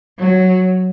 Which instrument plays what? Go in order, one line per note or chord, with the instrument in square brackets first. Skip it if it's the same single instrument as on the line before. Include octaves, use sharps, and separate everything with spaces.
[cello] F#3